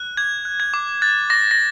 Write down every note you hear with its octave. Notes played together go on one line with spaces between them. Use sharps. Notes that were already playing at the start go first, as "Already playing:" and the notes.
Already playing: F#6
D6 G#6
F#6
G#6
D6
F#6 A6
D6 A#6
A#6